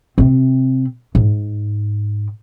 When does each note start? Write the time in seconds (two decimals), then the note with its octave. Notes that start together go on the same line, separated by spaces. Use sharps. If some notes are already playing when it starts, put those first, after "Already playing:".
0.18 C3 C4
1.15 G#2